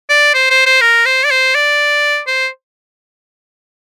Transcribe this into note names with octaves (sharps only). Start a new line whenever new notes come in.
D5
C5
C5
C5
A#4
C5
D5
C5
D5
C5